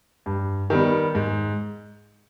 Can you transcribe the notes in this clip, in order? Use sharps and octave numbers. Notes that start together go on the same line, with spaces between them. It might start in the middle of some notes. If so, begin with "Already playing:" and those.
G2
D#3 G3 B3
G#2